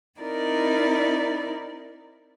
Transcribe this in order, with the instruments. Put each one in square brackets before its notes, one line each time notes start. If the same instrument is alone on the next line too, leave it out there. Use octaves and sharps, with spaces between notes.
[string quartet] C4 D#4 E4 A#4 D5